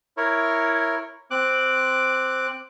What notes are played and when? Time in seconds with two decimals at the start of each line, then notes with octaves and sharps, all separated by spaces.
0.17 E4 A#4 C#5
1.31 C4 D6 F#6